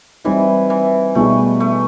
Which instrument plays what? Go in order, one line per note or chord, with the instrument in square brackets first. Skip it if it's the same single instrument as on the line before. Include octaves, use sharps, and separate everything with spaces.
[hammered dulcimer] E3 [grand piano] G3 C4 D#4
[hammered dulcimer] E3
[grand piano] B2 G3 B3 D#4 G#4 [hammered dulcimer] A3
[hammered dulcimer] A3